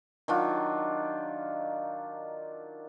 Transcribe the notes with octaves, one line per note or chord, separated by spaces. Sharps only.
D#3 F#3 D4 F4